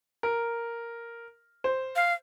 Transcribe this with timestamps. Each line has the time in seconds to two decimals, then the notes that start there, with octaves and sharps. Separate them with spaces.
0.23 A#4
1.64 C5
1.96 F5